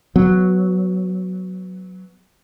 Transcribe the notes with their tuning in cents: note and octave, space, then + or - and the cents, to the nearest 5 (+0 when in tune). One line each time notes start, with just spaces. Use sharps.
F#3 +0 B3 +10